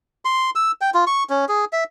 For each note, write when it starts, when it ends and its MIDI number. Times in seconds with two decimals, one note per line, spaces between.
0.25 0.50 84
0.55 0.71 88
0.81 0.90 79
0.94 1.05 65
1.07 1.24 85
1.30 1.45 61
1.49 1.65 68
1.73 1.84 76